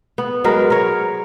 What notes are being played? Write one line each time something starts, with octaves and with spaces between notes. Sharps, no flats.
B3
F#3 G#3 A#4 B4
A#4 C#5